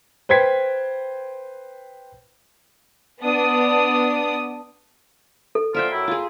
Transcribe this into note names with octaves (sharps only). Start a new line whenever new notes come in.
B4 C5 G5 G#6 B6
B3 D4 D#6
A4
D3 F3 F4 A#4 E5 G5
F#2 F#3 E4
F4 G#4